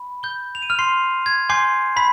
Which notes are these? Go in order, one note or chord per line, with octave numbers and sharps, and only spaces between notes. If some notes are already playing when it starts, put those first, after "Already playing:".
Already playing: B5
G6 G7
F7
D#7
F6 F7
C6 C7
G#6
G#5 C6 D6 G6 C7
B5 B6